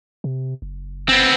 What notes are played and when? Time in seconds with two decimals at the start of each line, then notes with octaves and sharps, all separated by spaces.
0.24 C3
0.62 F#1
1.09 B3 C4